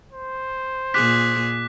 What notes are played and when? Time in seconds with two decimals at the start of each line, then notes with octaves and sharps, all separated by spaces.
0.12 C5
0.94 A#2 G#4 D6 F#6 B6